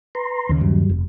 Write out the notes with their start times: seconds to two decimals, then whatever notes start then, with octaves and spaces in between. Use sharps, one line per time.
0.15 B4 A#5 C6
0.49 D#2 C#3
0.61 G2 F#3 G3
0.89 F1